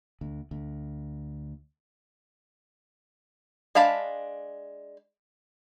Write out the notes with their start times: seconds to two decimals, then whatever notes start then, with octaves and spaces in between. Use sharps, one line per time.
0.21 D2
0.51 D2
3.75 G#3 D4 F5 A5 B5